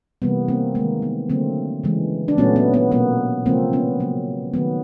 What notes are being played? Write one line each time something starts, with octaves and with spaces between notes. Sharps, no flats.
C3 E3 G3 A#3 B3
A#3 C4
D#3 G#3 A#3
B3
D3 F#3 A3 A#3 C4
C#3 E3 G#3
D4
A#2 F#3 A3 B3 C#4
B3
B3
B2 F#3 A#3 B3
C#3 F3 G#3 A#3 C4
B3 C#4
C#3 F#3 A#3
D#3 F#3 A3 B3